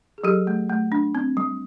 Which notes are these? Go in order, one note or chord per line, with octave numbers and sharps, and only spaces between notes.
G#4
F#3 G4 A4
A3
A3
D4
C4
G3